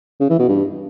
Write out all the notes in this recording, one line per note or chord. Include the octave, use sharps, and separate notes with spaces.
C#3
E3
B2
G2